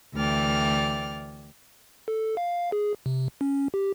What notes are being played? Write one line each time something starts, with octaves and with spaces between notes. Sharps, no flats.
D2 E3 D5 G5 F6
A4
F5
G#4
C3
C#4
G4